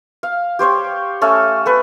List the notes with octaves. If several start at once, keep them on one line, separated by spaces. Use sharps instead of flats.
F5
G4 C5 C#5 G5
A3 C#4 A4
A4 B4 C#6